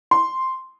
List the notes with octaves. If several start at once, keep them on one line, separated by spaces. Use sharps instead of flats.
C6